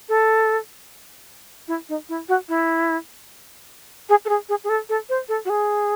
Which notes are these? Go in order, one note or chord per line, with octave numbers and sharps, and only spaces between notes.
A4
E4
D#4
E4
F#4
E4
G#4
A4
G#4
G#4
G#4
A4
A4
C5
A4
F#4
G#4